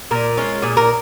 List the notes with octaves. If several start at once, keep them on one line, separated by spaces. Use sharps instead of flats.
A#2 A#4
G#3 C#4 F4
A#2 G#4
A#4